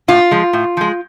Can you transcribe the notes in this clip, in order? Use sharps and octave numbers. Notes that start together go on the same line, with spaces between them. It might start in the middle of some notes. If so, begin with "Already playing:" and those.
A2 F4
F3 G#3
A2
F3 G#3